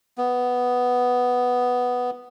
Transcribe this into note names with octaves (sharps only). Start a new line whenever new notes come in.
B3